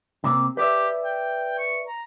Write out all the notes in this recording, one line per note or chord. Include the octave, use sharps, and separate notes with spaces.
C3 A#3 C4
G4 B4 D5 E5
G5
C#6
A#5